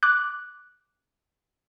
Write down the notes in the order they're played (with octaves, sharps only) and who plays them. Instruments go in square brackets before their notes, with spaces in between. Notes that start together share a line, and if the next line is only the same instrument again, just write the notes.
[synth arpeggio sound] D6 F#6